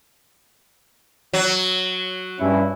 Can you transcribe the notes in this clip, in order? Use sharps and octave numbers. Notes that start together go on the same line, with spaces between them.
F#3
G2 C#4 E4